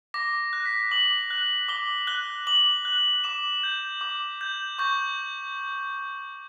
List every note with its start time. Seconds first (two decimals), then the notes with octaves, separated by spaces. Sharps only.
0.14 D6 A#6
0.53 F#6
0.66 B6
0.91 D6 F#7
1.30 F#6
1.69 D6 G7
2.07 F#6 G7
2.47 D6 F#7
2.85 F#6
3.24 D6 E7
3.63 G6
4.01 D6
4.41 G6
4.79 C#6 G6